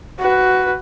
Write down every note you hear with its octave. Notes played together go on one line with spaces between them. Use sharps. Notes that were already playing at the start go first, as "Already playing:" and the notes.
F#4 B4